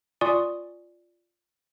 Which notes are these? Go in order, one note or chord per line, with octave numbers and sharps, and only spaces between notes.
F4 D5 G#5 C6 C#6 D#6